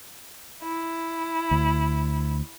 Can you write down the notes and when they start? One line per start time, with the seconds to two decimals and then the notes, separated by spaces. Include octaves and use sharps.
0.62 E4
1.51 D2